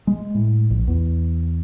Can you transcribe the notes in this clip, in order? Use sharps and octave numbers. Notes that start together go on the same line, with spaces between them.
G#3
A2
A#1
E2